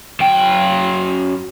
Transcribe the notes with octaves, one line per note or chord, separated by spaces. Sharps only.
F#2 G5